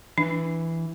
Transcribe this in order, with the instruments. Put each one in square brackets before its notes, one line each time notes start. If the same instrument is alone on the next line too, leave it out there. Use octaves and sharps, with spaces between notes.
[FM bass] E3 [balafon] D4